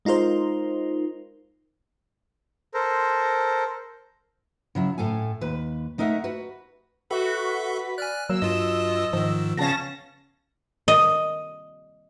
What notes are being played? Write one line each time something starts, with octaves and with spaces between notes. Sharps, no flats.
G#3 D#4 F4 A#4 C5
A4 A#4 C5
C#3 F#3 E4
A2 A4 F5 G#5
D#2 B4
A3 D#4 A#4 E5 F#5
F#4 B4
F#4 A4 B4 E5
D5 G#5 F6 F#6
F#3 A#3 E6
G2 F4 D#5
G#2 D#3 F3
C#3 B3 C#4 F5 A5 A#6
D#5